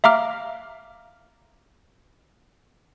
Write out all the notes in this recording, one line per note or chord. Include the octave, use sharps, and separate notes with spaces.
E5 F5 A#5 D6 F6